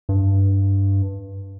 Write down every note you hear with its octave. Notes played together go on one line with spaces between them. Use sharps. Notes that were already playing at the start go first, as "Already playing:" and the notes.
G2